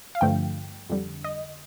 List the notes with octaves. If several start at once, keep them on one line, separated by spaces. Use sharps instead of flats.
F5
G2 D3 F3 A3 G5
F2 D3 G3
D#5